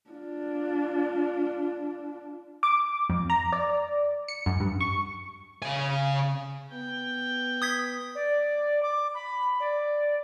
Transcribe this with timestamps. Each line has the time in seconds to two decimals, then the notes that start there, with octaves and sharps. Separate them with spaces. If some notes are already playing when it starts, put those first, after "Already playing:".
0.10 D4 F4
2.63 D6
3.10 F2
3.30 A#5
3.53 D5
4.28 C#7
4.46 F#2
4.60 G2
4.80 C#6
5.62 C#3 G#5
6.71 B3 G5
7.62 D#6 G#6 B6
8.15 D5
8.83 D6
9.14 B5
9.60 D5